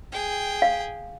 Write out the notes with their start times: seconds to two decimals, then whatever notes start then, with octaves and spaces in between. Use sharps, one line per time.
0.12 G#4 G5
0.62 F5